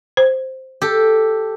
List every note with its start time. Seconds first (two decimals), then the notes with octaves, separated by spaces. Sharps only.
0.17 C5
0.82 G4 A4